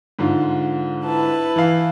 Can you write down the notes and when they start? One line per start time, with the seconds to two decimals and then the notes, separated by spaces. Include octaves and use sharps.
0.19 G#2 D3 F4
1.05 E4 B4 A5
1.56 E3 F5